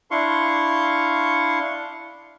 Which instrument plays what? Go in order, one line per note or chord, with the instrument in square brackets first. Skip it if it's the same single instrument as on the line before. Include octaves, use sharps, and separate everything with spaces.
[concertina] D4 E4 F5 C6 C#6